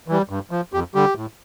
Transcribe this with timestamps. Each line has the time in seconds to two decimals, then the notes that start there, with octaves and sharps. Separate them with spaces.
0.08 E3 G3
0.29 G2
0.51 F3
0.73 F2 G4
0.94 D3 G3 G4
1.16 A2